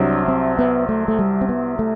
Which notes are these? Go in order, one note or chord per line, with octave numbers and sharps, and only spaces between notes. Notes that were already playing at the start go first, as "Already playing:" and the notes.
Already playing: C2 C3 F#3 D4
C4
B3
A3
A3
G3
C4
B3
A3